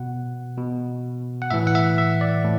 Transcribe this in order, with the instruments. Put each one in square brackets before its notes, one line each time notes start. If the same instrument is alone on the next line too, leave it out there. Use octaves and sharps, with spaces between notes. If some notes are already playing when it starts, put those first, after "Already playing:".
Already playing: [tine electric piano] B2 F#5
B2
F#5
A2 E3 E5
F#5
E5
E5
D5
A2